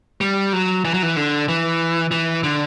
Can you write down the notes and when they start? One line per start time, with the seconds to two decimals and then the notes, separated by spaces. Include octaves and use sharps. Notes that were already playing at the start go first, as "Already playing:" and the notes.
0.21 G3
0.53 F#3
0.85 E3
0.94 F#3
1.03 E3
1.17 D3
1.48 E3
2.11 E3
2.44 D3